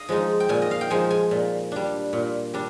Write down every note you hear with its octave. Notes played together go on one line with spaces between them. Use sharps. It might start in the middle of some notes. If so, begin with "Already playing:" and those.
Already playing: D#5 F5
F3 G#3 D#4
G5
A#2 G#5
D#5
F5
G5
F3 G#3 D#4 G#5
G#5
A#2
G3 D4
A#2
G3 D4